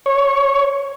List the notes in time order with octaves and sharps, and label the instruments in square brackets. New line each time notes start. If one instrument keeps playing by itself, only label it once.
[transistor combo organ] C#5